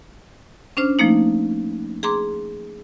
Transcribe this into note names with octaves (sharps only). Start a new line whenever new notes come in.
C#4 D4 C5 F6
F3 A3 A#3 D#4
G#4 A#5 C6 D6